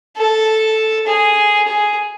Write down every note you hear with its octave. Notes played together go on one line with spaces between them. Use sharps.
A4
G#4
G#4